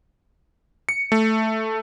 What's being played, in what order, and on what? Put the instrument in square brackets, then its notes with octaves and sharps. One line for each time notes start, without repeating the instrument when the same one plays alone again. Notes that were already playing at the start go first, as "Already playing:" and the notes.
[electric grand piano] C#7
A3